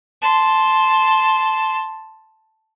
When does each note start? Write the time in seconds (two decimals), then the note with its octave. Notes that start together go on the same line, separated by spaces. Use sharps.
0.22 A5 C6